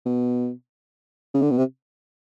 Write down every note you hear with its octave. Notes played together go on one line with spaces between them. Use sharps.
B2
C#3
D3
B2
C3